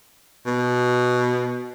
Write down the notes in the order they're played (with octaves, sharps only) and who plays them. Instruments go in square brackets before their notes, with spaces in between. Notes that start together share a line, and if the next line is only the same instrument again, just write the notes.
[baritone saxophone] B2